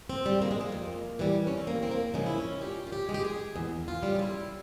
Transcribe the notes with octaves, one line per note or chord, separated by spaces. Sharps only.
C4
G3
A#3
G#3
A#3
F2
E3 G3
C#4
C4
E2 A#3
C4
A#3
C#3 F3 G#3 C4
E4
C#4
A#2 G4
F4
G4
G#3
G4
G#4
E2
F4
C#3 G3
F4
E4